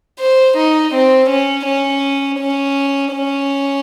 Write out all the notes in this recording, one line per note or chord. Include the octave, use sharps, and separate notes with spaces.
C5
D#4
C4
C#4
C#4
C#4
C#4